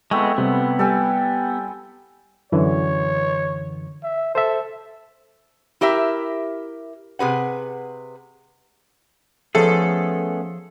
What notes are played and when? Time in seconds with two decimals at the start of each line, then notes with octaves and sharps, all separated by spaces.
0.11 G#3 A3 B3 C4 E4
0.38 C3 G3 B3
0.79 G3 A4 G5 G#5
2.52 F#2 D3 E3 C#5
4.03 E5
4.35 A4 C5 E5
5.81 E4 G4 A#4 E5
7.19 C3 G#4 B4 F#5
9.55 F3 A3 B3 C#4 G#4 A4